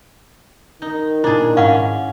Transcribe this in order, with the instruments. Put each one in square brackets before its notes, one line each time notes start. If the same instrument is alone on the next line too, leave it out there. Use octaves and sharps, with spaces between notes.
[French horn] D#3 [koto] D#4
[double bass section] A#2 [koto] D4 G#4 [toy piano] E4
[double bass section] G#2 [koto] C#4 [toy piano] F5 F#5